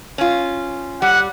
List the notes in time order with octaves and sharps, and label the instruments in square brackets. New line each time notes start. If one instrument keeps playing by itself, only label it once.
[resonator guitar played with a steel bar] C#4 F4
[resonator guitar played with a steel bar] G3 [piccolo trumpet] F#5